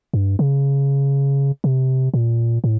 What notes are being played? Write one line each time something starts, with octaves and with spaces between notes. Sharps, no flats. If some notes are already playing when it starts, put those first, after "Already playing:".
G2
C#3
C3
A#2
A2